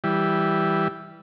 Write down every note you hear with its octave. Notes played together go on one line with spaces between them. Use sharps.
E3 G3